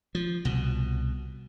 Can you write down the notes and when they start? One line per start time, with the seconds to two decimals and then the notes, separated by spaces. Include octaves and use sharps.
0.15 F3
0.45 C2 B2